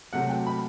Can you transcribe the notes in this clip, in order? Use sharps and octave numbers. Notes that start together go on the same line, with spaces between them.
C3 F#3 A3 F#5
G5
B5